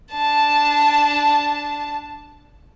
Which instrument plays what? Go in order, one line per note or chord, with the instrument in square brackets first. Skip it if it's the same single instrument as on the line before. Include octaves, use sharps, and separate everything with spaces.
[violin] D4 A5